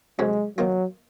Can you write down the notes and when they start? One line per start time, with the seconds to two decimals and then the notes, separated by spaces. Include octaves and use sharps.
0.19 F2 C3 F#3 G#3 C#4
0.58 D#3 F#3 A#3 F4